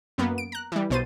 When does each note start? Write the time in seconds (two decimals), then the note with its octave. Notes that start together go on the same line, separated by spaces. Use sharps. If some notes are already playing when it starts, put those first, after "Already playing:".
0.18 F#2 A#3 B3
0.38 D7
0.52 A#5 F#6
0.72 E3 G3
0.90 B1 B2 C5 A6 D#7